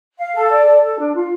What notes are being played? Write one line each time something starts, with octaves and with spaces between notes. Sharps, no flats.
F5
A4
D5
A4
A4
D4
F4